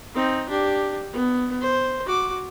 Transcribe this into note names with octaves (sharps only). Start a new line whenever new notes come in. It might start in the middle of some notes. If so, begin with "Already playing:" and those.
C4 D#4
D4 G4
B3
C5
F#4 D6